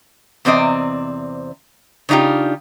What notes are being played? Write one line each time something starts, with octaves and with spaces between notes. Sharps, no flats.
E2 C3 C4 D5 D#5
C#3 D4 D#4 F4 G4